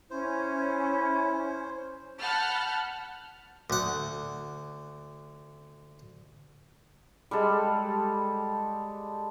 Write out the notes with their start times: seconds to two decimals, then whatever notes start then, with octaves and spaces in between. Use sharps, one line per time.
0.10 C#4 E4 C5
2.20 F#5 A5 B5 F6 G6
3.70 D2 F#5
7.31 G3 G#3 A4